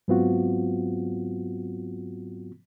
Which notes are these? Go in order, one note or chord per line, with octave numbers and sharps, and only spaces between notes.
G#2 F#3 B3 C4 F4 F#4